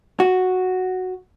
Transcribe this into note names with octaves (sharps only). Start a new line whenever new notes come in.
F#4